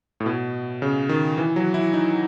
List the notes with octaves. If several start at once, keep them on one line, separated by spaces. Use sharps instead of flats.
A2
B2
C#3
D#3
E3
F#3
E4
D#4